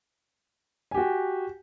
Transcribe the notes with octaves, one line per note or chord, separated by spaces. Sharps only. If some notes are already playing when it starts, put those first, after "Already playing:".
F#4 G4 G#5